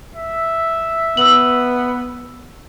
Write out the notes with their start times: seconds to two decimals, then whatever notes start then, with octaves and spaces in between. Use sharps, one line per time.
0.15 E5
1.17 B3 E6 F#7